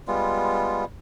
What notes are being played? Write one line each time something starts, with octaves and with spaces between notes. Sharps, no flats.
G3 G#3 B3 F4